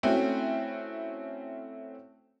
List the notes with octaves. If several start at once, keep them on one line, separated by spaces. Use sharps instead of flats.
A3 C4 C#4 E4 F#4